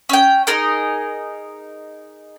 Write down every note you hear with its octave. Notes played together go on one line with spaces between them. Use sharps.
C#4 G5
D#4 G#4 A#4